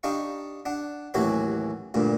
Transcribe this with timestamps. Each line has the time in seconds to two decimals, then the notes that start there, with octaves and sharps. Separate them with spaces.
0.03 D4 D#4 G4 F5 C#6
0.66 D4 F#5
1.14 A1 D#2 E3 F#3 F#4 G4
1.94 D2 G2 A#2